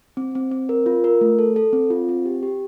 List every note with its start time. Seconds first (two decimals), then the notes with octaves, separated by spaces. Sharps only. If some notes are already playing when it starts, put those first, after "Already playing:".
0.17 C4
0.35 C4
0.52 C4
0.69 A#4
0.86 F4
1.04 A#4
1.21 A3
1.39 A4
1.56 A4
1.73 C4
1.90 F4
2.09 C4
2.26 G4
2.43 G4